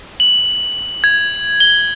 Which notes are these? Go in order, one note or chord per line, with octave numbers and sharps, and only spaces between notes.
F#7
G#6
G7